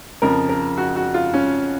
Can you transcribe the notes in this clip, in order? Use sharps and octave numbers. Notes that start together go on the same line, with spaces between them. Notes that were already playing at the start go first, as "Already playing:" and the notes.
F2 C#3 F3 A#4
A#4
F#4
F#4
F4
C#4